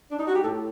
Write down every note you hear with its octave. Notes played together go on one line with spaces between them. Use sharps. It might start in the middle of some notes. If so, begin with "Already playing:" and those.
D4
D#4
F#4
G4
A2 A4